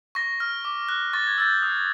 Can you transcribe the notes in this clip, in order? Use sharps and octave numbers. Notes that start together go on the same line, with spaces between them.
C#6 A#6
F6
D6
F#6
C#6 A6
G#6
E6 G6 A6
D#6